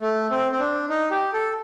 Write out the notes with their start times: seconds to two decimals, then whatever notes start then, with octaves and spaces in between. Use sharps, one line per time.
0.01 A3
0.31 C4
0.52 C4
0.59 D4
0.89 D#4
1.11 G4
1.33 A4